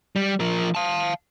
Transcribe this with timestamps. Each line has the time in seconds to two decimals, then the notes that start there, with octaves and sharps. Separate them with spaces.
0.16 G3
0.40 F3 A#4
0.75 F5 A5